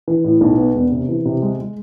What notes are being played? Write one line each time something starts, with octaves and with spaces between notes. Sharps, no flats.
E3
A2
B1
B3
E1
C3
E3
C3
G#3
G#3